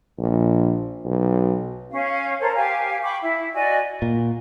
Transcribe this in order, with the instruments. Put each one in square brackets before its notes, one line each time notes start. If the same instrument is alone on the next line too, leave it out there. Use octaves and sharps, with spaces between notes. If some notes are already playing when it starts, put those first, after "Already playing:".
[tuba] A#1
B1
[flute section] C#4 F5
A4 A#4 C5 C#5
G4 F5 G#5
G5 B5 C#6 D6
E4
F#4 D5 D#5 G#5
[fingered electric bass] A#2